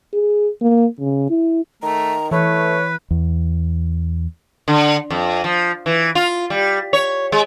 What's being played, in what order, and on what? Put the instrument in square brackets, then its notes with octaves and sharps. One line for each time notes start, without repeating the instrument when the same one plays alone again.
[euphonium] G#4
A#3
C#3
E4
[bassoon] D#3 [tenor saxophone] A3 [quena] A#5
[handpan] E3 [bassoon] A3 [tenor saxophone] B4 [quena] C#5
[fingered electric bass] E2
[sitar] D3
F2
F3
E3
F4
G3
C#5
G#3